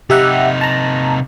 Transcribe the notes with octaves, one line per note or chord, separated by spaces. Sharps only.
C3 D#4 G4 E5 F#5
A5 A#5